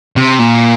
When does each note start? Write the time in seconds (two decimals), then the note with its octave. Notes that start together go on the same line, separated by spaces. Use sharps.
0.16 C3
0.39 A#2